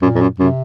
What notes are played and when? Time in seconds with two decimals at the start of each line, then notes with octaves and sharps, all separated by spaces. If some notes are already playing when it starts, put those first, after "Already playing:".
0.02 F#2 A#2
0.15 F2
0.21 F#2
0.39 F#2 C3